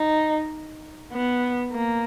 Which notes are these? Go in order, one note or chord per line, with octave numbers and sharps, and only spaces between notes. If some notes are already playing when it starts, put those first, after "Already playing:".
Already playing: D#4
B3
A#3